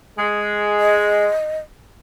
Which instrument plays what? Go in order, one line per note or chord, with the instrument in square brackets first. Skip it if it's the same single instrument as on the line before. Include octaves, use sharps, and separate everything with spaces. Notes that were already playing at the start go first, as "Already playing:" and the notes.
[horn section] G#3
[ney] D#5